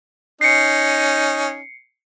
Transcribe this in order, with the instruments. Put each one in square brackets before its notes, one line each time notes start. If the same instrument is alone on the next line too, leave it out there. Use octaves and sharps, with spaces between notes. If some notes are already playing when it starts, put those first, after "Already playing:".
[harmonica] C#4 D#4 [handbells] C7 C#7